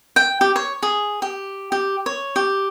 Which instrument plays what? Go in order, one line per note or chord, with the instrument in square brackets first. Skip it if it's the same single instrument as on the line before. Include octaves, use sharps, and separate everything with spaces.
[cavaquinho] G5
G4
C#5
G#4
G4
G4
C#5
G4